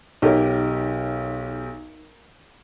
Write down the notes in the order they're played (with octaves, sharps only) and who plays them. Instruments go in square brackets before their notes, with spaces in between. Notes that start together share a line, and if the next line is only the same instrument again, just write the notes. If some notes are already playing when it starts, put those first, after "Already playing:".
[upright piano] B1 G4 [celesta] D#4 [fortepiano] A#4 C#5 D#5